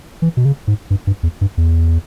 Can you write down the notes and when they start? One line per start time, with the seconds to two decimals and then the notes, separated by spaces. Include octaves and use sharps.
0.22 E3
0.37 B2
0.45 C#3
0.67 G#2
0.90 G2
1.07 G2
1.23 E2
1.41 G2
1.58 E2